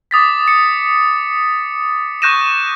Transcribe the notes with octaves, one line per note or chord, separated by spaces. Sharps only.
D6 D#6 A6 B6
C#7
C#6 F#6 G6 A#6 D#7 E7